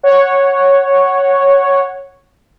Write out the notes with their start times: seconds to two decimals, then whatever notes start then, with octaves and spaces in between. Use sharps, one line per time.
0.03 C#5 F#5